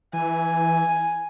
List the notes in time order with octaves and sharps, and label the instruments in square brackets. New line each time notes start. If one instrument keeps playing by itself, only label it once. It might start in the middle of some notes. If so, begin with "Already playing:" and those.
[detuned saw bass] E3 [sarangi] G#5